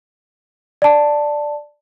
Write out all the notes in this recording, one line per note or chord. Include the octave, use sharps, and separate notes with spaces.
D5 A5